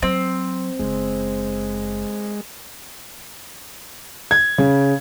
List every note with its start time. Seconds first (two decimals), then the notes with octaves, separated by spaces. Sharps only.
0.02 F#3 C4
0.79 F#1 G#3
4.31 G#6
4.58 C#3